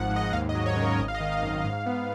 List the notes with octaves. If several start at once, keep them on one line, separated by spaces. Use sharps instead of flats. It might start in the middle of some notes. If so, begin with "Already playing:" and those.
Already playing: G#1 G#2 F3 F#5
G#2
D#5
D#2 F5
D#5
F#3
C#5
C#3
A#4
G#1 D#5
F5
D#5
D#3
F5
F#2
F5
G#2 F5
B3